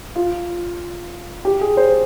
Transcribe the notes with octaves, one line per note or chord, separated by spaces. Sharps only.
F4
G4
G#4
C5